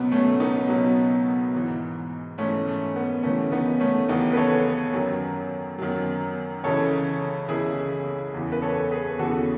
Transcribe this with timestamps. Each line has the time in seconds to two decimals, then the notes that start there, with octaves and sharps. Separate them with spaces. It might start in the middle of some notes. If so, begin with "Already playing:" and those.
Already playing: C#2 B2 F#3 B3
0.11 A3 C#4
0.40 B3 D#4
0.69 C#2 B2 F#3
1.53 G#2 E3
2.38 G#2 E3 A3 C#4
2.68 A3
2.96 B3
3.23 D#2 C#3 E3 A3 C#4
3.52 B3 D#4
3.80 A3 C#4
4.08 D#2 C#3 E3 B3 D#4
4.33 B4
4.37 A4 C#5
4.94 F#2 D#3 F#3
5.79 F#2 D#3 F#3
6.64 C#2 C#3 E3 A4 C#5
7.49 C#2 C#3 E3 E4 G#4
8.34 E2 C#3 E3
8.52 B4
8.62 A4 C#5
8.91 G#4 B4
9.19 E2 C#3 E3 F#4 A4